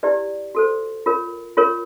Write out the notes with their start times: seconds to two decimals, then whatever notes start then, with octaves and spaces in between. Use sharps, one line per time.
0.03 E4 G4 B4 D5
0.55 F#4 A4 C5
1.06 F4 A#4 C#5
1.57 F4 A#4 C#5